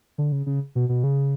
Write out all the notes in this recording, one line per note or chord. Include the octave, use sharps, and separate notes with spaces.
D3
C#3
C#3
B2
B2
C#3